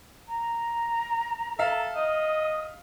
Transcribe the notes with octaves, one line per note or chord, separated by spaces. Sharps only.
A#5
A4 E5 F5
D#5 D#6